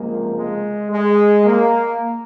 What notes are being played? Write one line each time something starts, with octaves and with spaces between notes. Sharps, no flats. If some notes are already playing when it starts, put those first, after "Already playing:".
Already playing: C#2 C3 F3 G#3 A#3
G#3
G#3
A#3